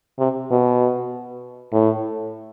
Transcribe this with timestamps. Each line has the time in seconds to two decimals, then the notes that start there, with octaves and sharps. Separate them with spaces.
0.19 C3
0.51 B2
1.73 A2